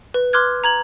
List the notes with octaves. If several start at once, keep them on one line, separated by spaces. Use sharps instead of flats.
B4
C6 D6 F6 F#6 G#6
A#5 G#6 F#7